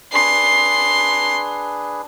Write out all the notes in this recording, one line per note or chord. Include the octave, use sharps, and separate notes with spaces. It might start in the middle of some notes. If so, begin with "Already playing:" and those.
D4 G#4 B4 C6